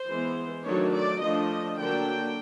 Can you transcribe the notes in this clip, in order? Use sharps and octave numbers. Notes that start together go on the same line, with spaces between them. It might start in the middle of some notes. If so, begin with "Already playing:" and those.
Already playing: C5
E3 G#3 B3
D#3 F#3 A3 D4 C#5
D5
F3 A3 D4 D#5
D3 F#3 A#3 D4 G5